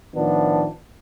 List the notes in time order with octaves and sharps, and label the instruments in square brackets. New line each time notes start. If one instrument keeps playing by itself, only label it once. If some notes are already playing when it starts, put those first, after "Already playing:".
[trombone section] A2 D#3 F3 B3 D4